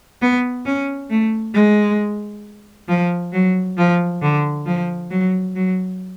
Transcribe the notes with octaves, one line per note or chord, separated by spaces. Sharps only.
B3
C#4
A3
G#3
F3
F#3
F3
D3
F3
F#3
F#3